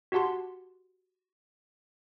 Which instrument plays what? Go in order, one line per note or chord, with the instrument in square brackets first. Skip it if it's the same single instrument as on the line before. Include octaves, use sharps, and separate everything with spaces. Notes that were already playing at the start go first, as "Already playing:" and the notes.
[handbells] F#4 G4 F#5 A5 C6